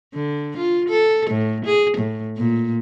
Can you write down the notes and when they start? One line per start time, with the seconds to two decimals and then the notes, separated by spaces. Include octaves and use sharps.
0.14 D3
0.57 F4
0.89 A4
1.30 A2
1.65 G#4
1.97 A2
2.37 A#2